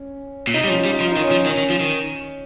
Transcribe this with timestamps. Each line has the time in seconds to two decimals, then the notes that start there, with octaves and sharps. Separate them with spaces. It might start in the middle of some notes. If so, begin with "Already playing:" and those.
Already playing: C#4
0.47 A#2
0.54 C3 D#4
0.64 G3 C#4
0.70 F3
0.77 F4
0.85 G3
0.89 D#4
1.00 F3 F4
1.12 D#4
1.16 D#3
1.23 C#4
1.31 F3
1.46 D#3 C#4
1.57 D#3
1.70 F3
1.80 D#3